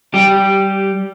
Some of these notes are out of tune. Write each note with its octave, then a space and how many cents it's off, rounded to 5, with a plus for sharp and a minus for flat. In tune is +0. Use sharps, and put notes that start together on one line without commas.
G3 -15 G4 +0